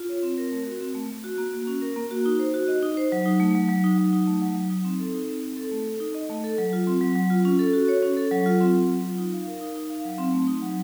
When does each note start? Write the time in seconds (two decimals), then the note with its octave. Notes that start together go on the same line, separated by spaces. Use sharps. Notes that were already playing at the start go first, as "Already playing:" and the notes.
Already playing: F4
0.09 C#5
0.23 C4
0.38 A#4
0.52 A3
0.66 F#4
0.81 C4
0.95 A3
1.10 A3
1.24 F#4
1.38 A#3
1.53 F#4
1.67 C#4
1.82 A#4
1.96 A#3
2.11 F#4
2.26 D#4
2.39 C5
2.54 F#4
2.68 D#5
2.82 D#4
2.97 C5
3.12 F#3
3.26 D#4
3.40 A3
3.55 F#3
3.69 F#3
3.84 D#4
3.98 F#3
4.13 D#4
4.27 A3
4.42 F#3
4.56 F#3
4.70 D#4
4.85 C4
5.00 A4
5.14 D#4
5.27 C4
5.43 C4
5.57 A4
5.71 A3
5.86 A4
6.00 D#4
6.15 D#5
6.29 A3
6.44 A4
6.58 F#3
6.73 F4
6.87 C4
7.01 F#3
7.16 F#3
7.30 F4
7.45 C#4
7.59 A4
7.74 F#4
7.88 C#5
8.02 C#4
8.17 A4
8.31 F#3
8.46 F4
8.60 C4
8.75 F#3
8.89 F#3
9.03 F4
9.18 D#4
9.33 F5
9.47 A#4
9.61 D#4
9.76 D#4
9.89 F5
10.05 F#3
10.19 C4
10.33 A3
10.47 D#4
10.62 F#3